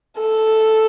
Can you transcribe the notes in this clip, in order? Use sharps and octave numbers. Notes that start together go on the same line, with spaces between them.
A4